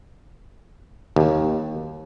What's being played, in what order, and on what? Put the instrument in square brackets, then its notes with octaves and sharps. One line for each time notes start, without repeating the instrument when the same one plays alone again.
[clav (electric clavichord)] D#2